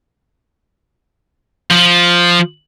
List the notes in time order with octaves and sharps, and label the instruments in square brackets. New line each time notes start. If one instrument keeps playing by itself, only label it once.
[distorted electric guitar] F3